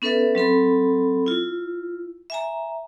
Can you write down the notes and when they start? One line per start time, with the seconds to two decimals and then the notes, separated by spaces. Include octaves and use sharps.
0.02 B3 C#4 A4 B4 E5
0.35 F#3 C4 A4 B5
1.26 E4 F4
2.30 E5 G#5 A#5